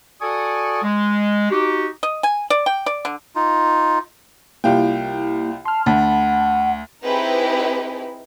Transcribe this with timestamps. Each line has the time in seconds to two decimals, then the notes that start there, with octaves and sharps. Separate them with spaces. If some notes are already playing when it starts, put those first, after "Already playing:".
0.22 F#4 A4 D5 G#5 C#6 D#6
0.83 G#3
1.51 D#4 F#4 G4
2.03 D#5
2.23 G#5
2.50 D5
2.66 G5
2.86 D5
3.05 D3
3.35 D#4 F4
4.64 C2 A#3 E4 F4 G4 G5
5.65 A5 C6 F6
5.86 D2 F#5 A5 B5
7.04 C4 D#4 E4 G4 G#4 B4